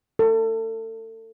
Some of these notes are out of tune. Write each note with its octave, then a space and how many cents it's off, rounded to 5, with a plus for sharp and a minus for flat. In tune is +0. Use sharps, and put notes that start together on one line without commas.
A4 +30